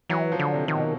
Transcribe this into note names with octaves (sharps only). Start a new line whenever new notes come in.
E3 F#3
F3
D3
C3
D#3
B2